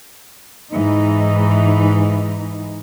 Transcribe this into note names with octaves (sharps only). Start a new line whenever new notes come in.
G#2 E3 D#4